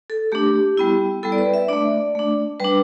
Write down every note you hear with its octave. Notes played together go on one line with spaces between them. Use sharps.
A4
A3 D4 G4
G3 B3 E4
G3 B3 E4 A4
D5
B4
E5
A3 D4 D5
A3 D4
G3 D4 B4